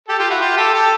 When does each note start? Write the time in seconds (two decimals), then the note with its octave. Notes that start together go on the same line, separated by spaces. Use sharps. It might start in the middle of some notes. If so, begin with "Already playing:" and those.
0.08 G4 A4
0.19 F4 G4
0.30 E4 F#4
0.41 F4 G4
0.57 G4 A4
0.74 G4 A4